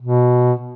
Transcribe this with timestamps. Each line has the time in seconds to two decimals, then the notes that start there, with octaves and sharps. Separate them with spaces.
0.02 B2